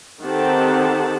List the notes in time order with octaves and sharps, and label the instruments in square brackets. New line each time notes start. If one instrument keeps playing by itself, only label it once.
[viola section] D#3 C4 G4 A4 F#5 A5